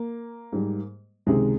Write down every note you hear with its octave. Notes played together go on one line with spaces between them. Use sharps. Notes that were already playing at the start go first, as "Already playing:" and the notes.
Already playing: A#3
G#2 G3
C#2 C3 D#3 G#3